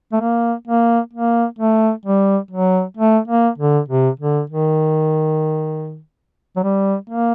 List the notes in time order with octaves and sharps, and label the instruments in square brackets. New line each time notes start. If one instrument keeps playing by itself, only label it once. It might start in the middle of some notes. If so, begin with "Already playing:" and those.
[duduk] A3
A#3
A#3
A#3
A3
G3
F#3
A3
A#3
D3
C3
D3
D#3
F#3
G3
A#3